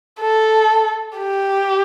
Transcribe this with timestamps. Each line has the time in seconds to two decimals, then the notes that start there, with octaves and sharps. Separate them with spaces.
0.21 A4
1.17 G4